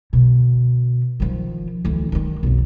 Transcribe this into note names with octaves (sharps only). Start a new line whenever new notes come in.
B2 D3
D#3 F3
D2 E3
D#3 G#3
B1 F2